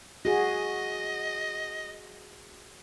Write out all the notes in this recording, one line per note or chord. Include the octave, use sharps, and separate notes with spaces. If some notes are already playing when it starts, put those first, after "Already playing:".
F#4 G#4 D#5